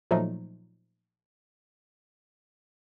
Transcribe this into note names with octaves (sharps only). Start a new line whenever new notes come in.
A#2 F3 F#3 A3 D#4